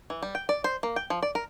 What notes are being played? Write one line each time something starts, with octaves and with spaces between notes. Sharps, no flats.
E3
G3
G5
D5
C5
A#3
G5
F3
D5
A#4